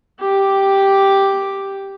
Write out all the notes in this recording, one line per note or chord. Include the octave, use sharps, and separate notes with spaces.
G4 D6